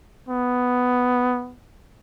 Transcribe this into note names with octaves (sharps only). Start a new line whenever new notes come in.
B3